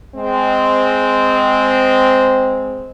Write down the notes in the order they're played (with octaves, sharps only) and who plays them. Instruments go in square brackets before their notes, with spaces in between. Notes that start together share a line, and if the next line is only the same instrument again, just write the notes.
[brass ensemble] G#3 C4